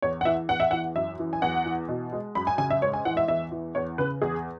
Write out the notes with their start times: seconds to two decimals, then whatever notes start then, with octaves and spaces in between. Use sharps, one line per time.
0.02 E2 C#5
0.21 F#5
0.25 E3 E5
0.49 E2 F#5
0.60 E5
0.71 E3 F#5
0.96 F#2 E5
1.19 E3
1.33 G#5
1.42 E2 F#5
1.66 E3
1.88 B2
2.12 G#3
2.35 F#2 B5
2.47 G#5
2.58 C#3 G#5
2.70 E5
2.82 G#2 C#5
2.93 G#5
3.05 E3 F#5
3.17 E5
3.28 E2 E5
3.52 E3
3.75 E2 C#5
3.98 C#3 B4
4.22 E2 G#4